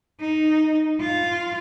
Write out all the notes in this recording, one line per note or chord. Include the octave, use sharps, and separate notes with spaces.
D#4
F4